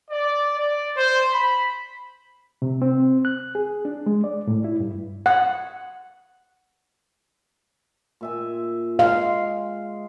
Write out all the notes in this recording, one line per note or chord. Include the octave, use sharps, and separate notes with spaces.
D5
D5
C5
B5
C3
C4
F#6
G#4
D4
G#3
D5
A2
E4
G2
F#5
A#2 E5 G#5
G#3 F5